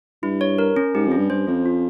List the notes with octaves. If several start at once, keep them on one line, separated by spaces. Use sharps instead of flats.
G2 E4
C#5
A#4
C#4
G#2 G4
F2
C#4
G2
G2 C5
F2 C#4
F4